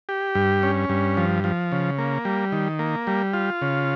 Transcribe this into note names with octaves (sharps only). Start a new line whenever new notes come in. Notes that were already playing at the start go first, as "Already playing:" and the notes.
G4
G2
C#4
G2
F3
F3
C#3
A#3
G3
D#3
A#3
G3
F4
C#3